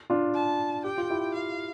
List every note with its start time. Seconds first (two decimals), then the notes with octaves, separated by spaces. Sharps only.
0.10 D4 F4
0.34 A5
0.84 G4 G5
0.98 F4
1.10 E4 G4
1.34 F5